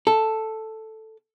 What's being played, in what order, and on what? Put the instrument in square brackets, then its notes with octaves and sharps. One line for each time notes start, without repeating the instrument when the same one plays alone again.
[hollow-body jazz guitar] A4